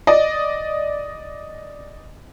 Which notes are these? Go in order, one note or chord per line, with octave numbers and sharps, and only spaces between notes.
D5 D#5